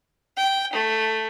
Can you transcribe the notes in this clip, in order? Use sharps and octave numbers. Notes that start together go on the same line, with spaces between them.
G5
A3